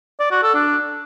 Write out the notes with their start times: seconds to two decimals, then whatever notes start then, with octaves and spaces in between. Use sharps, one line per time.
0.20 D5
0.31 F#4
0.43 A4
0.54 D4